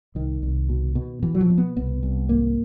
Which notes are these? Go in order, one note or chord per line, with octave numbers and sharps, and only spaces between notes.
C2 D#3
C2
B2
B2
B2 E3
F#3
F3
B2
B3
C2 B3
C2
G#1 A#3